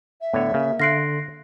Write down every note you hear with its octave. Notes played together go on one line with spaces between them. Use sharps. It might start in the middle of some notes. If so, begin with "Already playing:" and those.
E5
A2 D3 B3 C#5
C#3 A#3
D3 F5 C6 F#6 A#6 C7 D7